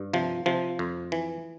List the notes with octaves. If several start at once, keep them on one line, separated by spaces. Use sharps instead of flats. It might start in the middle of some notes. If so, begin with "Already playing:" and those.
Already playing: G2
C3 F3
C3 F3
F2
E3